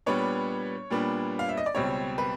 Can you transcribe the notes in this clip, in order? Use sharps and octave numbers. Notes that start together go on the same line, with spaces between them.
A#2 G3 B3 D4 C#5
A#2 G3 B3 D4
F5
E5
D#5
D5
C#2 B2 G3 C4 C#5
B4